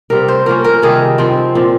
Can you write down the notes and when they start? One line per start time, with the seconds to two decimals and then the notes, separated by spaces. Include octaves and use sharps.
0.10 C3 G3 C4 A#4
0.28 C5
0.46 F3 A#3 C#4 A#4
0.64 A#4
0.82 C3 D#3 G3 G#4
1.18 F3 C4
1.55 A#2 F3 C4